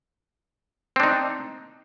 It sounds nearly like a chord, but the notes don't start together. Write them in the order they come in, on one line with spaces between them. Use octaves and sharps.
C4 D4 D#4